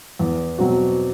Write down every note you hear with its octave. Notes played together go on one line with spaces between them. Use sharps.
E2
B2 F#3 C4 F#4